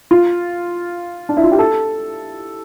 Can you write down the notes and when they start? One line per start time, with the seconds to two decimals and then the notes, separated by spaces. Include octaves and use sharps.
0.11 F4
1.29 D4
1.37 E4
1.44 F4
1.52 G4
1.59 A4